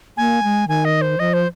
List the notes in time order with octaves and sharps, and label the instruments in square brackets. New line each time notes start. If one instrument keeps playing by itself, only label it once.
[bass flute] A#3 [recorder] G#5
[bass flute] G#3
[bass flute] D#3 [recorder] G#5
[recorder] D#5
C5
[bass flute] F3 [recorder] D#5
[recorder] C5